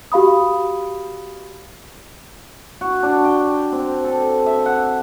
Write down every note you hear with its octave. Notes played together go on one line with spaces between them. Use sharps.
F#4 G4 F5 B5 D#6
F#4
D4
G5
C4
A4
E5
F#5